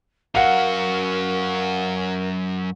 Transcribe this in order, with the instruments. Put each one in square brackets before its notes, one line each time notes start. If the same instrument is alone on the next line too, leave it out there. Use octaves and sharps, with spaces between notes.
[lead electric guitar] F#2 F#4 [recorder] A#4 [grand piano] F5 F#5